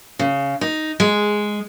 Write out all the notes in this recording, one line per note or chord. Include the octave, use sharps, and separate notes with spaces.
C#3
D#4
G#3